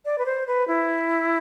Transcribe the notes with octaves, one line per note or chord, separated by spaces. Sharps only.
D5
B4
C5
B4
E4